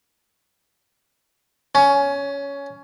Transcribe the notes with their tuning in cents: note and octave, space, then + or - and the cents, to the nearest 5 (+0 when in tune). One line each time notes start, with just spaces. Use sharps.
C#4 +15